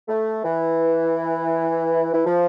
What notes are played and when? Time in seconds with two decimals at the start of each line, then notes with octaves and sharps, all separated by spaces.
0.08 A3
0.44 E3
2.14 E3
2.26 F3